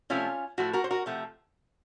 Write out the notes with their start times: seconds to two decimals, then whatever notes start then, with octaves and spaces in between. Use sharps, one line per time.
0.10 C3 F3 A3 C#4 F4
0.58 A2 F3 A3 F#4
0.73 F#4 A#4
0.84 C5
0.91 F#4 A#4
1.06 C3 F3 A3